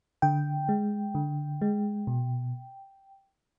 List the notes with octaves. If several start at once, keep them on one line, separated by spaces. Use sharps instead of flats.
D3 G5
G#3
D3
G#3
B2